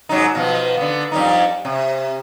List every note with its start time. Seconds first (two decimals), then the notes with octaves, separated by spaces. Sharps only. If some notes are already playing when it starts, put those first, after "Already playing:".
0.09 G#2 F#3 D#4
0.35 B2 F3
0.77 D3 B3
1.12 F2 G3 D#4
1.65 C3